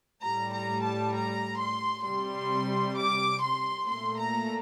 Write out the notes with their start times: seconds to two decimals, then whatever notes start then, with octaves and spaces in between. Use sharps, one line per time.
0.22 A2 G3 A#5
0.52 A#5
0.83 A5
1.14 A#5
1.59 C6
2.05 C3 G3 C6
2.97 D6
3.43 C6
3.88 A#2 A3 C6
4.19 A#5